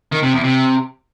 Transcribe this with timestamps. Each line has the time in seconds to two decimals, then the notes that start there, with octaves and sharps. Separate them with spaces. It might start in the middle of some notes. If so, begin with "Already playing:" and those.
0.12 D#3
0.23 C3
0.33 E2
0.44 C3